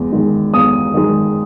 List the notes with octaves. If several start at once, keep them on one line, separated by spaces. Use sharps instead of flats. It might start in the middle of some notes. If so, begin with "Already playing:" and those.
Already playing: E2 G#3
D#3 G#3
E2 D#6
D#3 G#3